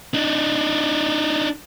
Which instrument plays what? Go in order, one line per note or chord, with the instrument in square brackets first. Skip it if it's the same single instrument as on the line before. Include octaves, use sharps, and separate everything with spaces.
[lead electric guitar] D4 D#4